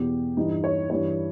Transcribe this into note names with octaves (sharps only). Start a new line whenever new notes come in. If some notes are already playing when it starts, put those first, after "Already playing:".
Already playing: E2 B2 G4
G2 E3 D#4
C#5
G2 E3 C#5